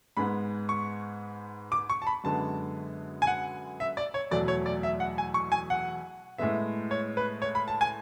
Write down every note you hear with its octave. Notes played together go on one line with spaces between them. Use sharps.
G#2 G#3 B3 B5
C#6
D6
C#6
A5
B5
F#2 D3 G#3 B3 A5
G#5
F#5
E5
D5
C#5
E2 B2 F#3 A3 D5
C#5
D5
E5
F#5
G#5
C#6
G#5
F#5
A2 G#3 B3 E5
C#5
B4
C#5
B5
A5
G#5